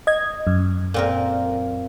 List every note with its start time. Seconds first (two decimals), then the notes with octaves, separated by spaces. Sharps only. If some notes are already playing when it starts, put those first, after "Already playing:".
0.07 D#5 G#6
0.47 F#2
0.94 A#2 C4 A#4